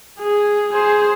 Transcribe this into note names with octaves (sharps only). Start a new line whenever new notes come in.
G#4
G#4 C5